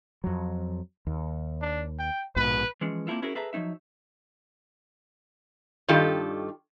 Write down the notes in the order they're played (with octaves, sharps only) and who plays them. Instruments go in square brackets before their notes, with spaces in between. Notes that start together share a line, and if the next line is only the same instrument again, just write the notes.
[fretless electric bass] F2 F#3
D#2
[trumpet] D4
G5
[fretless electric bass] A#1 G#2 B2 [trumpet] B4
[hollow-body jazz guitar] E3 F3 G#3 C#4
A#3 C4 C#4 E4 F4 A4
C#4 E4 F#4 G#4 A#4
G#4 A4 B4 E5 A#5
F3 F#3 C#4 D#4 E5
[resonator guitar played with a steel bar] G2 D#3 F4 G4 A4